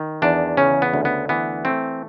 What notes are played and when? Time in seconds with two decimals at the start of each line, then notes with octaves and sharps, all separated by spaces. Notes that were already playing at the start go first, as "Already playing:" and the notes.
Already playing: D#3
0.22 E2 D4
0.57 C#3 C#4
0.82 B3
0.94 D2
1.05 B3
1.29 E3 B3
1.65 A3 C4